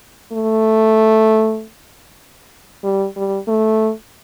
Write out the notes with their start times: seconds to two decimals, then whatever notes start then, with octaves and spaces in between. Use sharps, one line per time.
0.32 A3
2.84 G3
3.16 G3
3.48 A3